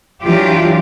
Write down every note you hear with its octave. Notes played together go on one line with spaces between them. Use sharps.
E3 F#3 D4 F4 G4